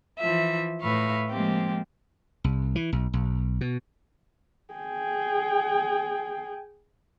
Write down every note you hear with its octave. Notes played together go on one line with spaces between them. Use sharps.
E3 F3 E5
A2 B4 E5 F5 C#6
F3 G#3 A#3 C4 G4
C2
E3
B1
B1
B2
G#4 G5